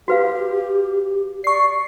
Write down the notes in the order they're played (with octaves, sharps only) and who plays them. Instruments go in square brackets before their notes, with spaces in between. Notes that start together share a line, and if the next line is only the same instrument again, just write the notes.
[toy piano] F#4 B4 F5 [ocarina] G4
[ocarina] D5 [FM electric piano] C#6 C7